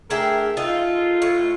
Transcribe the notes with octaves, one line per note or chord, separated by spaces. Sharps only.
A3 D4 G#4 A#4 E5 G5
D#4 F4 A4
A2